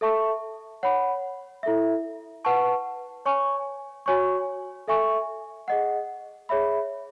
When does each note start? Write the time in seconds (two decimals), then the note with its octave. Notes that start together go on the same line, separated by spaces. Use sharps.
0.01 A4 E5 A5 C#6
0.83 C#5 F#5 B5
1.63 E4 A4 E5
2.45 B4 F#5 A5 C#6
3.25 C#5 G#5 C#6
4.06 F#4 C#5 G#5 C#6
4.88 A4 E5 G#5 C#6
5.68 G#4 D#5 F#5
6.49 G#4 C#5 E5 B5